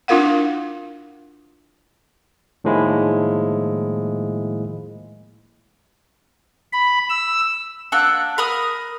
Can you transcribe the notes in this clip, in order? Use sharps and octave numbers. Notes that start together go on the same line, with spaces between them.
D4 E4 F4 A#4 F5 F#5
A2 D#3 F3 G#3 A#3 E4
B5
E6
A#3 D4 F#5 E6
A#4 B5 D#6